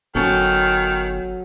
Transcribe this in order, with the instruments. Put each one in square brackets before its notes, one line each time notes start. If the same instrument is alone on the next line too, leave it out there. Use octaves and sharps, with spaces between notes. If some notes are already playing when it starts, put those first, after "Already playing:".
[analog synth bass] G1 [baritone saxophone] D#3 [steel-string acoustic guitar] F#3 C#4 A4